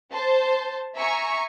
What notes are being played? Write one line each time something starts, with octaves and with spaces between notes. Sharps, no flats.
C5 A5
E5 G#5 A#5 C#6